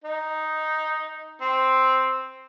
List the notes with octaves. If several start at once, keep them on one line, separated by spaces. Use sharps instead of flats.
D#4
C4